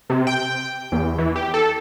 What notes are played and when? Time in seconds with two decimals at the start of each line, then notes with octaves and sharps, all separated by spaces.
0.10 C3
0.27 G5
0.92 E2
1.18 E3
1.36 G4
1.54 A4